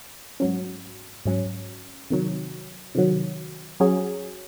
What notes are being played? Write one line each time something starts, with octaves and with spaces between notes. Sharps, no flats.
G#2 F#3 C#4
G#2 F#3 C#4
C3 D#3 F#3
C3 D#3 F#3
F#3 C#4 G#4